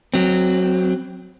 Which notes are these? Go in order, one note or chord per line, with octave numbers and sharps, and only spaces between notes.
F#3 C4